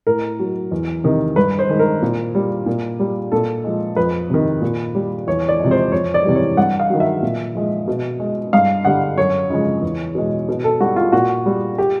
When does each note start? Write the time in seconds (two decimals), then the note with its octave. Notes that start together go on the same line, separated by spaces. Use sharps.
0.07 A2 A#4
0.39 F#3
0.71 E2
1.04 C3 D#3
1.36 G2 B4
1.59 C5
1.70 D#3 G#3
1.79 A#4
2.02 A#2
2.35 G3
2.66 A#2
3.00 G3
3.32 A#2 A4
3.64 F3 G#3
3.96 F2 B4
4.30 C3 D#3
4.62 A#2
4.95 G3
5.27 E2 C#5
5.49 D5
5.59 C3 F3 G#3
5.71 C5
5.92 F2 C#5
6.14 D5
6.25 C3 E3 G3
6.35 C#5
6.57 G2 F#5
6.80 F5
6.90 D#3 F#3
7.00 E5
7.23 A#2
7.55 F3 G#3
7.88 B2
8.20 G#3
8.53 G2 F5
8.85 D3 G3 F#5
9.18 F#2 C#5
9.50 C#3 F3 G#3
9.82 E2
10.15 B2 G#3
10.48 B2
10.64 A4
10.80 G3 F#4
10.96 F4
11.12 A#2 F#4
11.46 G3
11.78 G4